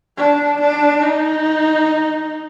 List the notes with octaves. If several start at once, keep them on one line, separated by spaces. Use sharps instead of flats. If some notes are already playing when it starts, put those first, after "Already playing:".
D4
D4
D#4